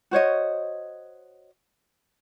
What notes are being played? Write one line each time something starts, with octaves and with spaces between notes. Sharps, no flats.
F#4 C5 C#5 D#5